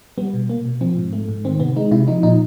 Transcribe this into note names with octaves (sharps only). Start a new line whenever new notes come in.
G3 B3
B2
A#3
B2
F3 C4
G#2
A3
G#2
D#3 C4
C3 B3
G#3 D#4
C3 E4
F3 D#4
A#2 D#4